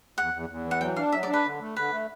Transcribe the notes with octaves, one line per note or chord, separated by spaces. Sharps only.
E2 F#5
E2
E2
E3
F#5
F#3 G5
D4 F5
F#3 E5
D5
D4
B4
D3
A3
D3 B4
A3